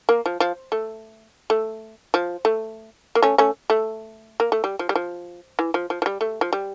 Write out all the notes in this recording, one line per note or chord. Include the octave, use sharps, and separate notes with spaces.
A#3
F3
F3
A3
A3
F3
A3
A#3
A3 C#4
A3 C#4
A3
A#3
A3
G3
F3
G3
F3
E3
F3
F3
F3
G3
A3
F3
G3